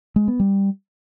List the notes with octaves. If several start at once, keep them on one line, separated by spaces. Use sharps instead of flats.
G#3
B3
G3